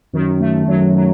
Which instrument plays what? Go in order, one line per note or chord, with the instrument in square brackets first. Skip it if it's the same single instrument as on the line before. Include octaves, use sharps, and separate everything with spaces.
[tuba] F#2 [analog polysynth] D#3
[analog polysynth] A3
[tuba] F#2 [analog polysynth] F#3
[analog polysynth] F#3